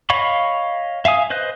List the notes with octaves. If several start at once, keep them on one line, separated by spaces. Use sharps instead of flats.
C#5 D#5 F5 B5 C#6
E5 F5 G#5 D#6
B4 C5 D#5 F#6